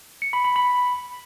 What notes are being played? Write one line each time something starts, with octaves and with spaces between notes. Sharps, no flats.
C#7
B5
B5
B5